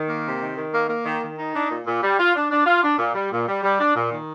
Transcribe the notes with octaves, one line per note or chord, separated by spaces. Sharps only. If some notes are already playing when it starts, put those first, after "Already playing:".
Already playing: D#3
A#3
C3
D#3
D#3
A#3
A#3
D#3
D#3
D#4
D4
A#2
A#2
G3
F4
D4
D4
F4
D4
A#2
G3
A#2
G3
G3
D4
A#2
D#3